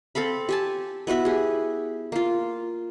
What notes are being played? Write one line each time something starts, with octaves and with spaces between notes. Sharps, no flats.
C4 A4 F5 B5
G4 G#5 A5
B3 E4 F#4 E5
G4 G#4
A#3 F4